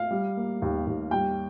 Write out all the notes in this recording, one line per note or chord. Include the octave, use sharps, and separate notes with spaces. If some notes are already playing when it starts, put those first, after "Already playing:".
Already playing: F5
G3
A#3
D#2
D#2
G3 G5